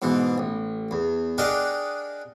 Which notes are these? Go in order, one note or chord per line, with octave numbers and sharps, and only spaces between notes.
G#2 B2 E3
A1
E2
D4 G4 G#4 A#4 D#5 F#5